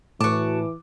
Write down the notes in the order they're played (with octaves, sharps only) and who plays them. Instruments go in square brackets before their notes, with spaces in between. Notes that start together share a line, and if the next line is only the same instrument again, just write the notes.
[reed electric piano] A2 [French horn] E3 [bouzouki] F#4 A5 [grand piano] D6